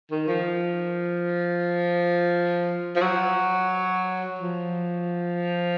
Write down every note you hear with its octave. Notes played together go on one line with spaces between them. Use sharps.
D#3
F3
F3
F#3
F3